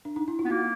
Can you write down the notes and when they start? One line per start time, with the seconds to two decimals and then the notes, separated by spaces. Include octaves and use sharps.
0.05 D4
0.16 D#4
0.28 E4
0.39 F4
0.45 B3
0.50 A#3 F#4